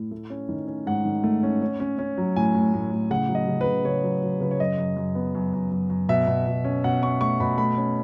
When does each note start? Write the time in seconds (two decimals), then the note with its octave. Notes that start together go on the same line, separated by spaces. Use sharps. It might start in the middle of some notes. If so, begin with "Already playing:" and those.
Already playing: A2
0.11 A3
0.30 C#4
0.49 D#3
0.67 C#4
0.87 G#2 F#5
1.05 D#3
1.24 A3
1.43 C#4
1.62 C#4
1.80 C#4
1.99 C#4
2.18 F#3
2.36 A2 G#5
2.55 A2
2.74 A2
2.92 A2
3.11 C#3 F#5
3.29 F#3
3.35 D#5
3.48 C#3
3.61 B4
3.66 C#3
3.85 C#3 C#5
4.04 F#3
4.22 F#3
4.40 C#3 B4
4.51 C#5
4.60 F#2 D#5
4.78 F#2
4.96 F#2
5.15 B3
5.35 F#2
5.53 F#2
5.71 F#2
5.90 F#2
6.09 B2 E5
6.27 B2
6.47 B2
6.64 C#4
6.84 B2 F#5
7.02 C#4 C#6
7.21 A3 C#6
7.40 B2 B5
7.58 A3 B5
7.77 C#4